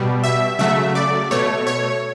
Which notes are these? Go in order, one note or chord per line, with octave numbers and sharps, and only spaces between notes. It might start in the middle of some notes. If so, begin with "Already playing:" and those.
Already playing: B2 G3
E5
C#3 F#3 A3 E5
D5
B2 A3 C#5
C#5